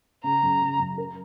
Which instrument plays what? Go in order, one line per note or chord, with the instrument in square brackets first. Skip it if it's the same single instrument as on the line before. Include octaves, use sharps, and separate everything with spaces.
[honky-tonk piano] C#3 [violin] A#5
[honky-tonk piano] F#2
C#3
F#2
A#4